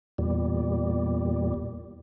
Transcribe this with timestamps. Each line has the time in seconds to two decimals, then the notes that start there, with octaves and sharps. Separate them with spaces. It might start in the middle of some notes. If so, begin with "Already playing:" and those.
0.18 E2 A#2 G3